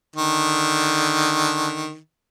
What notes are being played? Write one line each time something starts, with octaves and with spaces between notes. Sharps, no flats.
D3 D#3